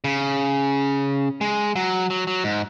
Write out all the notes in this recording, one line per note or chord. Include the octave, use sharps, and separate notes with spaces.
C#3
G#3
F#3
F#3
F#3
G#2